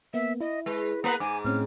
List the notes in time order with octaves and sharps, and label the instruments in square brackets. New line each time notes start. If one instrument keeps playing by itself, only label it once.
[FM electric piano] A#3 B3 [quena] E5
[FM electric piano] E4 [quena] D#5
[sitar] G#3 [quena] B4
[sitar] A#3 B3 B4 [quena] A#5
[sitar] G#2 [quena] G#5 [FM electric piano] D6
[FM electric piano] A2 C4 C#4 [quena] F6